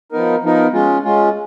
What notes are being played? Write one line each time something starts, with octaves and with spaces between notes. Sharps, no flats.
F3 B3 D#4 A#4
F3 B3 D#4 A#4
G#3 C#4 F4
G#3 C#4 F4